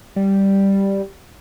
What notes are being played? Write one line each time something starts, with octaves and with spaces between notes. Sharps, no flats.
G3